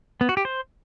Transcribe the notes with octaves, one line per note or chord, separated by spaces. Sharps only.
B3
F#4
G4
C5